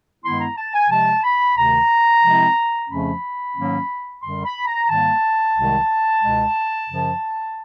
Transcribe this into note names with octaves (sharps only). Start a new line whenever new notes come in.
G2 D#3 G#3 B3 E4 C6
A#5
A5
G#5
C3 F3 G#3 A5
B5
D2 C3 D#3 A#5
C3 F3 G#3 C4 E4
F2 C#3 F3 A3 C#4 B5
G#2 D#3 F#3 A#3 C#4
F#2 D3 G3 C6
B5
A#5
G#2 D#3 G3 A#3 A5
C2 C3 D#3 G#3
C#2 B2 G#3
F#2 C#3 F3